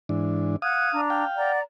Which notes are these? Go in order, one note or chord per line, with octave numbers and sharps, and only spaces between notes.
G#2 E3 D4
F5 F#5 D#6 F#6 G#6
D4 A#5
F5 G5
D5 F#5 A#5